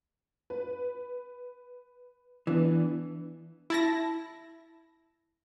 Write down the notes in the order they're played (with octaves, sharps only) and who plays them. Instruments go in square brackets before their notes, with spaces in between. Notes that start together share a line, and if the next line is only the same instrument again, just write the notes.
[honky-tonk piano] B4
[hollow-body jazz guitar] E3 [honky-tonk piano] B3 D4
[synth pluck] E4 A5 A#6